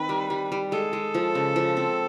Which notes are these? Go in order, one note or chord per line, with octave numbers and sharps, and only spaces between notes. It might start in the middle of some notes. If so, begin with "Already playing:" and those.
Already playing: D#3 C4 B4
G3
G3
G3
G#3 A4
G#3
F3
C#3
F3
C4